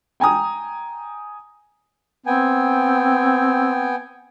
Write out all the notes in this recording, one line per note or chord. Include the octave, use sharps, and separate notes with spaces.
G5 G#5 A#5 D#6
B3 C4 G5 G#5